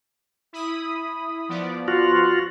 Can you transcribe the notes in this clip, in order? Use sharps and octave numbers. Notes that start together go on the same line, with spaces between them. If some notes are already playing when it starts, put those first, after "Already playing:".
E4 B5 D#6
F3 B3 D5
F4 F#4